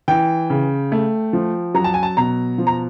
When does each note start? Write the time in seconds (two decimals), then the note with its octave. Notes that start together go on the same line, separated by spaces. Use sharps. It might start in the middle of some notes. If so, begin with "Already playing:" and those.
0.08 E3 G5
0.50 C#3
0.92 A3
1.33 F3
1.74 F#3 A#5
1.84 A5
1.94 G#5
2.03 A5
2.17 B2 A#5
2.58 F3
2.67 A#5